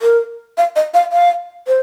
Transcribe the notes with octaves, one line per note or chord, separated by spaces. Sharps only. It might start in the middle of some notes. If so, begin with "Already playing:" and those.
A#4
F5
D#5
F5
F5
C5